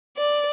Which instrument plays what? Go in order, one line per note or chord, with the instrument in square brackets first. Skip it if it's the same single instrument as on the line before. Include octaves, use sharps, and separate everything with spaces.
[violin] D5